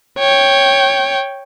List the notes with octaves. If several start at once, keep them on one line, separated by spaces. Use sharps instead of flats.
C#5 G5